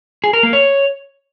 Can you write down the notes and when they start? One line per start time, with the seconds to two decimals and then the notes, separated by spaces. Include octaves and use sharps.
0.24 G#4
0.33 A#4
0.43 A#3
0.53 C#5